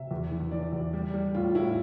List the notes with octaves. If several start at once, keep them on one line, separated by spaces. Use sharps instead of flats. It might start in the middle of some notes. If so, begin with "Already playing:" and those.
Already playing: C3 E5
E2
E3
E3 D5
E2
G3
G3
A2 F4
A2 E4